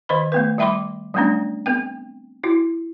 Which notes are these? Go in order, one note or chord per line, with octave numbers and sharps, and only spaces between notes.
D#3 C5 D#5 B5
A3 B3 B4
G3 E5 G5 B5 C6 D6
F#3 G3 A3 B3 C#4 D4
B3 C4 G5
E4 F#4